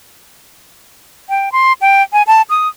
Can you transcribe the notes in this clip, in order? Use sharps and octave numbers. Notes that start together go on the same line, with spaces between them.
G5
C6
G5
G#5
A5
D#6